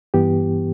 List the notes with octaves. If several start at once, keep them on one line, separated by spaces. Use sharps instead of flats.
G2 E3 B3 G4